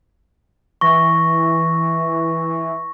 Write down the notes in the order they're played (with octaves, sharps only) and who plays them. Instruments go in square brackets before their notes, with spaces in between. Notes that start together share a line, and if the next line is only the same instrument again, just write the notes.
[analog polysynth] E3 [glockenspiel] C#6 A#6